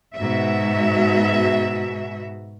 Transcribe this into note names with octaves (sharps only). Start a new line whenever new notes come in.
G#2 B2 F#4 E5